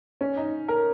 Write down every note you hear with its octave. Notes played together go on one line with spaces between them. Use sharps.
C#4
D#4
A#4